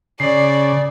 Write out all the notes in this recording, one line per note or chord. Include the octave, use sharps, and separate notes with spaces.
C#3 D5 C7